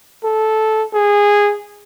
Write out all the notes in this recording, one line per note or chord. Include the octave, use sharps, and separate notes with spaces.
A4
G#4